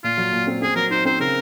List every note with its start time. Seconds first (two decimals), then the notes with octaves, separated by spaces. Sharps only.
0.04 A#2 F4
0.17 F#3
0.33 A#2
0.47 C4
0.62 C4 G#4
0.76 F#3 A#4
0.90 D#4 C5
1.05 C4 C5
1.20 C#3 A#4